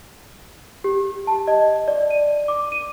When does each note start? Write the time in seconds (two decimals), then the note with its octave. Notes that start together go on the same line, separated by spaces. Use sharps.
0.84 G4
1.27 A5
1.48 D#5
1.88 D5
2.11 D#7
2.48 D6
2.72 D#7